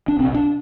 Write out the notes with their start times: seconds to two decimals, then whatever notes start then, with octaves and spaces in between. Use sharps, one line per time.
0.08 D4
0.19 C2 C4
0.23 C3
0.35 D4